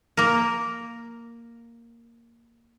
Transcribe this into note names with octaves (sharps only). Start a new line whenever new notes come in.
A#3 A#4